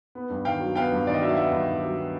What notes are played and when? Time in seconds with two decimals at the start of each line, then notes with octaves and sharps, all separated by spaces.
0.15 B3
0.30 G2
0.45 D#3 F5 G5
0.60 F#3
0.76 B3 F5 G5
0.92 G2
1.07 D#3 D5
1.14 D#5
1.22 F#3 E5
1.29 F5
1.37 B3 E5 F#5
1.52 G2
1.68 D#3
1.83 F#3
1.97 B3